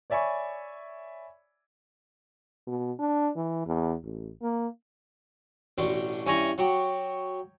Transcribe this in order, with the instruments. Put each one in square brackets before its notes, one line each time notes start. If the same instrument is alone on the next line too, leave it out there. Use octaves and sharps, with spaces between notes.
[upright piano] C#5 D5 E5 G#5 B5 C#6
[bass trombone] B2
D4
E3
E2
A1
A#3
[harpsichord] A1 B2 D4
G2 C#4 E4 G#5 A#5 C#6
F#3 F#4 G4